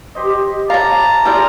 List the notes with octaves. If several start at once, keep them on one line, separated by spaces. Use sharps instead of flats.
G4 C5 D#5
C#5 F5 A5 A#5
E4 F4 G4 G#4 D5